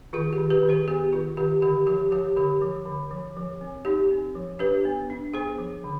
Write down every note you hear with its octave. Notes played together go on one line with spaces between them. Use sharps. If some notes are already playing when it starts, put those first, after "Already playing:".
D#3 F4 G#4
G4
D#3
G4 B4
D#3
G#4 C5
B3 G4
D#3 F4
D#3 G4
D3 G4
F3 G4
F3 G4
D3 G4
F3
D3
F3
F3
C4
D#4 G4
C4
F3
D4 G4 B4
B3
D4
B3 G#4 C5
F3
D3